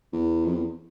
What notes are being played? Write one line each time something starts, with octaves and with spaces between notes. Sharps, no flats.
E2
F2
E2